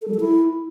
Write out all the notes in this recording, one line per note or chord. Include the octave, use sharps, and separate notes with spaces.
A4
G3
A4
E4